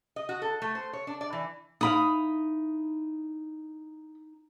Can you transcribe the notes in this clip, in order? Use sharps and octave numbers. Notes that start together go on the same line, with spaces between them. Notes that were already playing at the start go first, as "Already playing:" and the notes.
D#5
F#4
A4
A3
C5
C#5
D4
D5
E3
D#4 E4 F5 B5 D#6